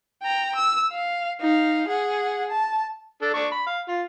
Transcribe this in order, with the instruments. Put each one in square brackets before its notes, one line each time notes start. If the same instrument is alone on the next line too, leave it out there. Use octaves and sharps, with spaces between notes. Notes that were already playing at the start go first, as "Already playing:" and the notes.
[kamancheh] G5 A#5
E6
F5
D#4 F5
G#4 F#5
A5
[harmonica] D4 A4
D4 C#6
B5
F5
F4